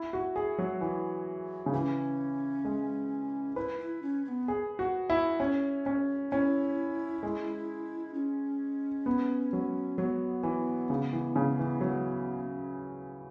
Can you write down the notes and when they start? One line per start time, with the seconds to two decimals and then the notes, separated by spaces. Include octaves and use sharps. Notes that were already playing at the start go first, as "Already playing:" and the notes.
Already playing: E4
0.13 F#4
0.36 G#4
0.58 F#3
0.81 E3
1.66 C#3
1.73 E3 E4
1.77 C#4
2.65 G#3
3.56 E4 B4
3.80 E4
4.02 C#4
4.25 C#4
4.28 B3
4.48 G#4
4.79 F#4
5.10 E4
5.40 C#4
5.86 C#4
6.31 C#4 E4
7.23 G#3
8.14 C#4
9.06 B3
9.53 F#3
9.98 F#3 B3
10.43 E3
10.90 C#3
11.13 E3
11.36 C#3
11.59 E3
11.81 F#3